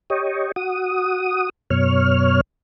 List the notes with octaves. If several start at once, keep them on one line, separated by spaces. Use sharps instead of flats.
G4 C#5 D#5
F#4 D#6
F#2 B2 C#5 F6